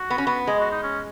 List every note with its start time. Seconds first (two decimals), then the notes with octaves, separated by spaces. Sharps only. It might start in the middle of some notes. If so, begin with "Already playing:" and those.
Already playing: F#4
0.10 B3
0.18 C#4
0.27 B3
0.47 G#3 G#4
0.59 F#4
0.72 D#4
0.83 C#4